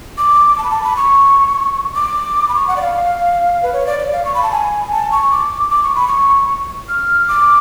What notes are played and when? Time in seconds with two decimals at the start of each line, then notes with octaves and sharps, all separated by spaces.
0.18 D6
0.58 A5
0.64 B5
0.70 A5
0.84 B5
0.96 C#6
1.95 D6
2.49 B5
2.55 C#6
2.68 F#5
2.76 D5
2.81 F5
3.63 B4
3.73 C#5
3.86 D5
3.99 D5
4.12 F5
4.25 C#6
4.34 B5
4.43 A5
4.52 G#5
4.92 A5
5.12 C#6
5.31 D6
5.70 D6
5.83 C#6
5.95 B5
6.08 C#6
6.89 F6
7.28 D6